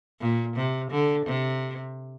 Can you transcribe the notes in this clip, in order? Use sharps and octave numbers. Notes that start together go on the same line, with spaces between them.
A#2
C3
D3
C3